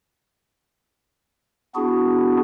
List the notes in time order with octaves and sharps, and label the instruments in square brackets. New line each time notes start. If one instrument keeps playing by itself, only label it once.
[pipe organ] B3 D4 E4 F#4 G#4